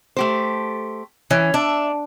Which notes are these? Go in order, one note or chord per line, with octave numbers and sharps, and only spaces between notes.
A3 G4 C5
E3 C#4
D4 E5